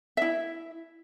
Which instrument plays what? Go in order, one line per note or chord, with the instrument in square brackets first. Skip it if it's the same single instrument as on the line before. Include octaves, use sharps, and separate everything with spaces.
[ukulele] E4 E5